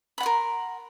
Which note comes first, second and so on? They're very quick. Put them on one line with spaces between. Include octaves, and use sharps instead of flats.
B5 F#5 C6 A#4